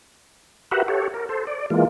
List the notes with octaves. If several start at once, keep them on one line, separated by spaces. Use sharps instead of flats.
F#4 G4 A#4 B4 E5 F#5
G4 A4 C#5
A#4
A4 C5
D5
E3 G#3 A#3 F4